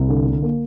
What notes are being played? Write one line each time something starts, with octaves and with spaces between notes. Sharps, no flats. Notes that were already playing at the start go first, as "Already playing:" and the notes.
Already playing: C2
D3
D3
A#3